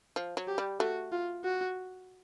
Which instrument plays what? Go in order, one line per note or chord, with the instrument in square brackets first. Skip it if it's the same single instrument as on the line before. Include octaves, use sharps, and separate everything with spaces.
[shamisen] F3
F#3
[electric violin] G4
[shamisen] G3
[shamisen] A3 [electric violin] F#4
[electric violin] F4
F#4